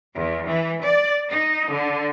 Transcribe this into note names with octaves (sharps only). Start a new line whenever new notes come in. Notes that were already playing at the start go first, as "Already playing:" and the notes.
E2
E3
D5
D#4
D3